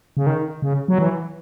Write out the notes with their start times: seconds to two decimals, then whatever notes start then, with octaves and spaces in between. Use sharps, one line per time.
0.17 C#3
0.27 D#3
0.62 C#3
0.88 F#3
0.99 E3